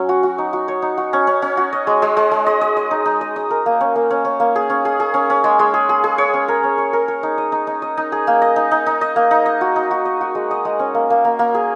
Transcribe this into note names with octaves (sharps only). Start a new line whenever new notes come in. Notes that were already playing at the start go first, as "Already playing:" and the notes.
Already playing: F#3 C#4
F#4
F#4
D#4
F#4
C#5
D#4
F#4
C#4
C#4
C#4
F#4
D#5
G#3
G#3
G#3
G#3
D#5
D#5
D#5
D#4
D#4
D#5
D#5
A#4
A#3
C#4
A#3
C#4
C#4
A#3
G#4
C#4
G#4
G#4
C#4
C#4
G#3
G#3
G#4
G#4
G#4
C#5
C#4
A#4
C#4
C#5
A#4
A#4
D#4
D#5
D#4
D#4
D#5
D#4
G#4
A#3
D#5
D#4
D#4
D#4
D#5
A#3
D#4
D#5
F#4
D#4
F#4
D#5
F#4
G#3
D#5
G#3
C#4
A#3
A#3
A#3
A#3
G#4